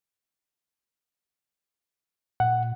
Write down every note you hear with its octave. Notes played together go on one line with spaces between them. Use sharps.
A#2 F#5